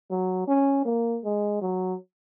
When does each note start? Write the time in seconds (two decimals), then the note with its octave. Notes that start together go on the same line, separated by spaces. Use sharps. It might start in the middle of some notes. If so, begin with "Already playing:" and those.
0.11 F#3
0.47 C#4
0.85 A#3
1.24 G#3
1.61 F#3